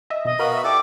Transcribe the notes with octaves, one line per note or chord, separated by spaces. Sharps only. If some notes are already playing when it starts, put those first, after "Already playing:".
D#5 E5
B2 D#5
B3 F#4 A#4 F5 B5 D#6
E5
E4 G4 A4 D5 D6